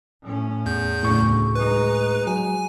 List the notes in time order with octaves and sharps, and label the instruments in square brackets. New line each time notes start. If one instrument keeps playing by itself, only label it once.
[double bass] A2 C#4
[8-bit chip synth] E2 G6
[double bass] D2 C#3 [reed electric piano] A2 C#6
[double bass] G#3 D#4 [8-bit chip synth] B4
[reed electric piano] F#3 [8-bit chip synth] G#5